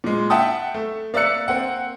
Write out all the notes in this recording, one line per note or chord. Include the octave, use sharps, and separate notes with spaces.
A#2 G#3
E5 F#5 G5 A5 D#6
A3
A#3 D5 E5 E6 F#6 C#7
A#3 C4 F#5